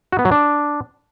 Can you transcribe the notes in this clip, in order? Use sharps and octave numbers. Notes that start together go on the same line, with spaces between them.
F#4
B3
F#3
D4